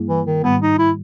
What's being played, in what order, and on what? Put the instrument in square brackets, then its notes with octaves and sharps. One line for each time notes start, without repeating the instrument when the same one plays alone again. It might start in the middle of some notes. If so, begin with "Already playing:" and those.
Already playing: [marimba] G2 G3 A#3 E4 G#4
[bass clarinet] E3
D#3
[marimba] G#2 D#3 G3 [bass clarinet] B3
[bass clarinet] D#4
E4